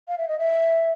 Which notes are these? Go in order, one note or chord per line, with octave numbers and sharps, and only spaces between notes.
F5
E5
D#5
E5